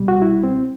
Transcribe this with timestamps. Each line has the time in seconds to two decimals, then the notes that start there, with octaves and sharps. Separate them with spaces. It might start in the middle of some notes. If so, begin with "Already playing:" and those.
Already playing: C2 B2 G3
0.08 F#4
0.22 E4
0.43 C4